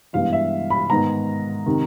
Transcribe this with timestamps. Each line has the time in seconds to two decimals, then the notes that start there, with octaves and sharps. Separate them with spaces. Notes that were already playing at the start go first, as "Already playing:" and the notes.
0.13 G2 E3 G#3 B3 F5
0.33 E5
0.70 B5
0.90 G#2 D#3 G#3 B3 A#5
1.66 C3 D#3